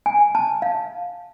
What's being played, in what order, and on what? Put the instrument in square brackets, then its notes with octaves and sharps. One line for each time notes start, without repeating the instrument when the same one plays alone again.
[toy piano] G#5
A5
F5